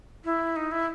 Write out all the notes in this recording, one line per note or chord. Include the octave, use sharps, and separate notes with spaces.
E4
D#4
E4